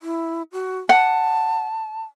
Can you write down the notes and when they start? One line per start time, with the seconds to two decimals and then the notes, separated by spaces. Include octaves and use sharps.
0.01 E4
0.52 F#4
0.89 F#5 A5